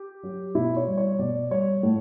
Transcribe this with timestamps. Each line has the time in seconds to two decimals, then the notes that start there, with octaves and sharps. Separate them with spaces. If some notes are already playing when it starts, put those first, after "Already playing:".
Already playing: G4
0.23 F#3
0.55 B2 E4
0.77 C#5
0.87 G3
0.97 C#5
1.19 B2 D5
1.51 G3 C#5
1.83 A2